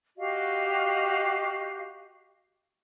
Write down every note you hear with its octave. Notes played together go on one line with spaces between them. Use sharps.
F#4 G4 D#5 F5